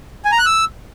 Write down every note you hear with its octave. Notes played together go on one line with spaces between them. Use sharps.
G#5
A#5
F#6
E6